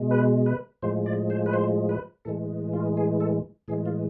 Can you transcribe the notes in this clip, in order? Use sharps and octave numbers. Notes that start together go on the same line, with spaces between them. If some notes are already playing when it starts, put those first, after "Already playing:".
Already playing: B2 G#3
B4
B4
A2 F3 G#3 C5
D5
C5
B4
C5
B4
A2 E3 G#3 A4
F4
G#4
A4
A2 E3 G#3 G#4
F4